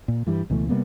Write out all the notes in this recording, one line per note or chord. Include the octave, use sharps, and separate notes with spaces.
A#2
G2 E3 G3
C#2 B2 E3 A3
C3 G3 A#3 B3